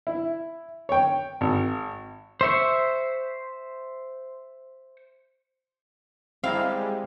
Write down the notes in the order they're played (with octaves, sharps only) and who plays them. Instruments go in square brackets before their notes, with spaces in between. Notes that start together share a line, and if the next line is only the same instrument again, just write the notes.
[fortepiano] E4
C#5 G5
G#1
[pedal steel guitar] C5 E5 C#6
[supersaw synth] G3 G#3 [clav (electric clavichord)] C4 E4 A#5 [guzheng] F5